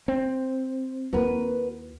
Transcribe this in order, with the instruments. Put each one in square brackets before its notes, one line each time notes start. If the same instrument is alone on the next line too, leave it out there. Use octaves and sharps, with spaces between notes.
[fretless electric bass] C4
[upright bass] D#2 E4 [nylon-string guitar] F#4 A#4 B4